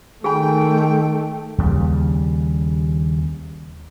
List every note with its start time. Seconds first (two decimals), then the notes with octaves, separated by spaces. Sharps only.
0.24 D#3 A3 G#4 G5 G#5 B5
1.58 D#2 C#3 G3